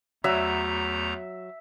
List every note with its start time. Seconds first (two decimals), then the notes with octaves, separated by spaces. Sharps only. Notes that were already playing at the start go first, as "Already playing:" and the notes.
0.24 E2 F#3 A3 E5 A#5